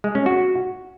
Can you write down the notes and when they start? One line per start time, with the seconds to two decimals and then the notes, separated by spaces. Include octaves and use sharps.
0.04 G#3
0.15 C#4
0.26 F#4